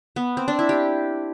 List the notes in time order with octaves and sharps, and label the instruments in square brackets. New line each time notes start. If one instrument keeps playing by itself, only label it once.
[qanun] B3
C4
D4
E4
G4